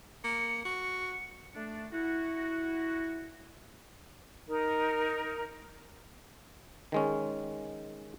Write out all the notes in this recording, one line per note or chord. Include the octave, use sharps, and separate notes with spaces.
A#3 C#7
F#4 C#7
A3 D4
E4 F#4
D#4 A#4
D#3 G#3 C#4